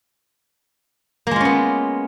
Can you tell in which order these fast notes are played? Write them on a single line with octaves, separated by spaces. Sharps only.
A#3 G#3 F4 C#4 B3